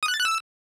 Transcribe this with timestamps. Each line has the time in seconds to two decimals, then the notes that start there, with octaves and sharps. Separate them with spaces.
0.03 D#6
0.08 F#6
0.14 A6
0.19 F#6
0.25 E6